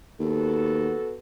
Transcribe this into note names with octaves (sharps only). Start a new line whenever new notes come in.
D#2 B3 F#4 A4